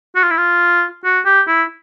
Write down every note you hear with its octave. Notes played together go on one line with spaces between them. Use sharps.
F#4
F4
E4
F4
F#4
G4
E4